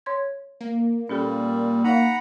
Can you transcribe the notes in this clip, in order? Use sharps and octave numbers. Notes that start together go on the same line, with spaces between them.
C#5 C6 G#6
A#3
A#2 G3 C#4 G4 A4
D#4 F5 F#5 A#5 B5